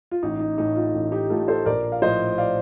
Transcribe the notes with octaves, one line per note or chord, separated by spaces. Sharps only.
F4
A1 D#4
D#4
A2 A3 D#4
F4
A1
D#4 G4
A2 A3 F4 A4
A4 C5
A#1 A#4 D5
F5
A2 F3 C5 D#5
D5 F5